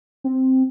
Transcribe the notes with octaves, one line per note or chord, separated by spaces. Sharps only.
C4